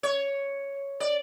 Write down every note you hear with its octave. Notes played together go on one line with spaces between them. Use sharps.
C#5
D5